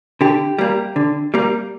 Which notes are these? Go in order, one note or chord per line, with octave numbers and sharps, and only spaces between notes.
D3 G4
G3 A#3
D3
G3 A#3